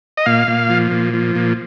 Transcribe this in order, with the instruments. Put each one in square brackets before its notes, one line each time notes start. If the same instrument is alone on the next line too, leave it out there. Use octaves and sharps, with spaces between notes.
[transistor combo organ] D#5
A#2 F5
A#2
F3
A#2
F3
A#2